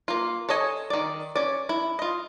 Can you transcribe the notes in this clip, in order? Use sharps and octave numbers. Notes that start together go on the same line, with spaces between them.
A#3 F4
A4 C#5 D#5 G#5
D#3 D5
C#4 D5
E4
F4 D#5